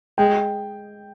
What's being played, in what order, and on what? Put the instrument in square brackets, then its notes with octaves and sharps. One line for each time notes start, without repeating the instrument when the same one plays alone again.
[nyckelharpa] G#3 [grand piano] G5